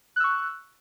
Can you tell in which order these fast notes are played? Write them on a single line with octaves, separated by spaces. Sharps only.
F#6 E6 C#6